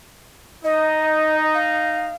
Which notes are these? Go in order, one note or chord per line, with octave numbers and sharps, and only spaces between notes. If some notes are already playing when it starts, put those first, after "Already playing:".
D#4 D#5
F5